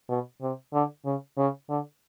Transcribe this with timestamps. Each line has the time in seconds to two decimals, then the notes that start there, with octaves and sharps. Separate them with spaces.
0.09 B2
0.41 C3
0.73 D3
1.05 C#3
1.37 C#3
1.69 D3